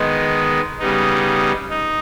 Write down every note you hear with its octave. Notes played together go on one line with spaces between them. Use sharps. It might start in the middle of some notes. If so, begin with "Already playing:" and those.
Already playing: D#3 G#3 B3
C#3 G3 B3 D#4
D#4